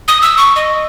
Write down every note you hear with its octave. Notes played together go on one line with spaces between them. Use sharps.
D#6
E6
C#6
D#5